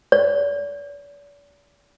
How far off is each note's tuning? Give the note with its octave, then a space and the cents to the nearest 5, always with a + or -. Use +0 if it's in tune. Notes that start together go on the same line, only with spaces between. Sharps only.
D5 -40